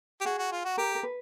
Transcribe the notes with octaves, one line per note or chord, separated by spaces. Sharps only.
G4
F#4 G#4
F#4
F4
F#4
G4 A#4
A#4
B4